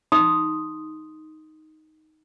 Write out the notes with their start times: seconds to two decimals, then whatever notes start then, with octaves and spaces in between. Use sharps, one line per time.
0.12 D#4 C6 D#6